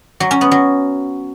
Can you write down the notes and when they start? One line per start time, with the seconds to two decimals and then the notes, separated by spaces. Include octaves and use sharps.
0.20 F#3
0.31 C#4
0.41 B3
0.51 F#3